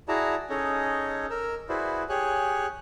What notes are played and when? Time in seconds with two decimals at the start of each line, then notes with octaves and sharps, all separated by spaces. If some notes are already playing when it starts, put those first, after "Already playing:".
0.08 E4 F#4 G#4 D5 A5 A#5
0.49 C#4 D#4 G#4 A4 C#5 D#5
1.30 A#4 E6
1.69 E4 F#4 G#4 B4 C5 D5
2.09 G4 G#4 C#5 G#5 F#6